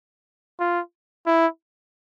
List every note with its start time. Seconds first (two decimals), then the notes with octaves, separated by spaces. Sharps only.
0.60 F4
1.27 E4